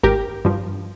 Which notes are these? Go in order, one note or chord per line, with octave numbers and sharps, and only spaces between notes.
G#1 G4 A#4
G2 F3